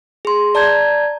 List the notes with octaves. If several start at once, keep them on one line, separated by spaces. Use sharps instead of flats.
G#4 C6
D5 A5 A#5 G6 G#6